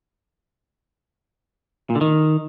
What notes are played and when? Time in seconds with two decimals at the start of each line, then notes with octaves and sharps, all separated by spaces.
1.90 A#2
1.95 D3
2.01 D#3